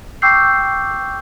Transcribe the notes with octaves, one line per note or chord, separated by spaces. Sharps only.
G5 C#6 D6 E6 G6 C7